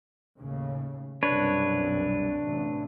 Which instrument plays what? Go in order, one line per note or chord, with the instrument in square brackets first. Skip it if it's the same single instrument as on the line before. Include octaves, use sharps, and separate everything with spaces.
[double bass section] D#2 A2 C#3
[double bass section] C2 F#2 B2 [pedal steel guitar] D4 B4 C#5
[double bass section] A1 C3